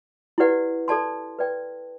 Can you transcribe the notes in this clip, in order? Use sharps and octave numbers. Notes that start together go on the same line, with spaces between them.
E4 G4 B4 D5 F#5
A4 D5 A5 C6
B4 D5 G5